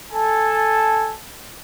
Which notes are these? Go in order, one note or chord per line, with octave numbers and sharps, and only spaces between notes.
A4 G#5 A5